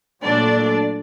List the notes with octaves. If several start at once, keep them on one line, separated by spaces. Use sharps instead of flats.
A#2 F#3 A3 D4 D5